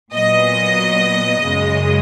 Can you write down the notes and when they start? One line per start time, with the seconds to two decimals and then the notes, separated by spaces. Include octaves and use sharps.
0.13 A#2 F#3 B3 D#5
1.42 F#2 C#3 G#3